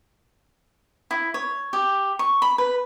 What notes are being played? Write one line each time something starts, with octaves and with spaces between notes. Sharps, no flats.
E4
C#5
G4
C#6
B5
B4